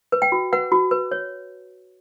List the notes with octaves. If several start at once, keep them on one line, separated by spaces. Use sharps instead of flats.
B4
G5
F#4
B4 F#5
F#4
B4
C#5